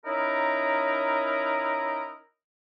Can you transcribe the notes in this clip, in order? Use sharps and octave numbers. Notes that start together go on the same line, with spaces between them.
C#4 D#4 E4 A#4